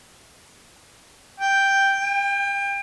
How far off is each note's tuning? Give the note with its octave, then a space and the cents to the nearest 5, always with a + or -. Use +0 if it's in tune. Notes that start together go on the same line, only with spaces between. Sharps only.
G5 +0
G5 +30